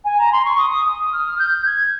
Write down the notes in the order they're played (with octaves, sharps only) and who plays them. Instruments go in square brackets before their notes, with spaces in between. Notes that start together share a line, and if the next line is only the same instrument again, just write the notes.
[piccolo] G#5
A#5
C6
C#6
D#6
D#6
F6
G6
G#6